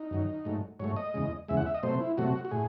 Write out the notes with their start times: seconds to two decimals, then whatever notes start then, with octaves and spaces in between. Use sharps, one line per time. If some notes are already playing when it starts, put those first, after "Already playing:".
Already playing: D#4
0.11 F#2 D#3 F#3
0.45 G#2 F#3 A3
0.80 G#2 F#3 A3 C#5
0.96 D#5
1.14 E2 C#3 G#3
1.48 E2 C#3 G#3 E5
1.57 F#5
1.66 E5
1.75 D#5
1.83 C3 F#3 A3 C5
2.00 E4
2.17 C3 F#3 A3 F#4
2.45 F#4
2.51 A2 G#4